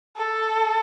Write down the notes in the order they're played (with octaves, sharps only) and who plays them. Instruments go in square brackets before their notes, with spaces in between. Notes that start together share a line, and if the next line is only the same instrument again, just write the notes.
[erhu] A4